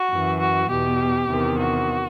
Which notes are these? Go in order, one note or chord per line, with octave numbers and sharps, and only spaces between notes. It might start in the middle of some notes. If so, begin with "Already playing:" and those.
Already playing: F#4
F#2 E3
F#4
E2 B2 G4
E2 C3 D#3
F#4